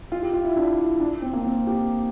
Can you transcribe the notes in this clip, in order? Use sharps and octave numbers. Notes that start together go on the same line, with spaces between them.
F4
G4
F4
E4
D4
E4
D4
C4
A#3
C4
G4